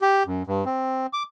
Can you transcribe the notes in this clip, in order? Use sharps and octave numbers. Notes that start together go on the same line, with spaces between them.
G4
F#2
G2
C4
D6